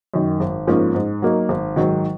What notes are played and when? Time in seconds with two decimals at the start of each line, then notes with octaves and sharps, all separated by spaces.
0.14 F#2 D#3
0.40 G#1
0.67 G#2 F3 A#3 C#4
0.95 G#2
1.22 F#3 A#3 D#4
1.49 G#1
1.76 G#2 D#3 F#3